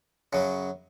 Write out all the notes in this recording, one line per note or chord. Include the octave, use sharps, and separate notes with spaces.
F#2 C#3 F#3